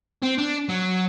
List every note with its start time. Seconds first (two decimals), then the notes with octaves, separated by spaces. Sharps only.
0.23 C4
0.38 D4
0.69 F#3